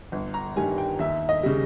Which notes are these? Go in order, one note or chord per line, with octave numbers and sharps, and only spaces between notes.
G1
A#5
G2 D#3 G3 G#5
G5
D#2 E5
D#5
C#3 G3